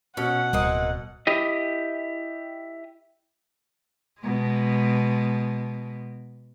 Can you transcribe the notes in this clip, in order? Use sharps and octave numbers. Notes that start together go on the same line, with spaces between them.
B2 C#4 F#5
D1 G3 A#3 C4 D#5
E4 G4 D#5
B2 G#3